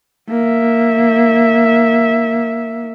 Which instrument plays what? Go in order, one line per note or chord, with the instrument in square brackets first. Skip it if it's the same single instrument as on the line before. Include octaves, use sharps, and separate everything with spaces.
[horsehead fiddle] A#3 E5